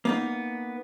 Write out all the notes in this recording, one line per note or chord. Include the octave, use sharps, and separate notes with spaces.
A#3 B3 D#4